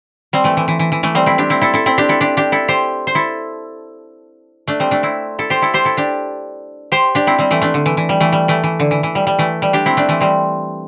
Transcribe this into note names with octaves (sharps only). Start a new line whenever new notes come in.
G3 C4
E3 A3
E3
E3
E3
E3
E3 A3
G3 C4
C4 E4
D4 G4
C4 E4
E4 A4
E4 A4
C4 E4
D4 G4
E4 A4
D4 G4
D4 G4
E4 A4
G4 C5
C5
E4 A4
A3 D4
G3 C4
A3 D4
C4 E4
E4 A4
G4 C5
E4 A4
G4 C5
E4 A4
D4 G4
G4 C5
D4 G4
C4 E4
G3 C4
E3 A3
A3 D4
D3
E3
E3
G3
E3 A3
G3
E3 A3
E3
D3
E3
E3
G3
G3
E3 A3
G3
D4 G4
C4 E4
A3 D4
E3 A3
G3 C4